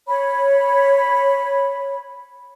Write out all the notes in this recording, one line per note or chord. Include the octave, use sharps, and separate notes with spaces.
C#5 B5